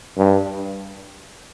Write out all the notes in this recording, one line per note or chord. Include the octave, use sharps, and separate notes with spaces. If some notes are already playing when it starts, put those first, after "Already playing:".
G2